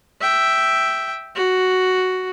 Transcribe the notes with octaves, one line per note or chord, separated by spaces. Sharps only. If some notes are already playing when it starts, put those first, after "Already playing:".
E5 G5
F#4